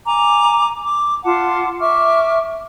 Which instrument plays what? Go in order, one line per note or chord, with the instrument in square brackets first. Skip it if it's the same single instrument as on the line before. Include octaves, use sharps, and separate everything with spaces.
[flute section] G#5 A#5 D6
D6
F4 F#5 A5 D6
E5 C#6 D6 F6